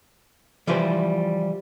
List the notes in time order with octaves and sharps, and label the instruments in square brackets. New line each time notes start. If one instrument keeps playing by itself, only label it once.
[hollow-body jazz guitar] E3 F3 G3 B4 C5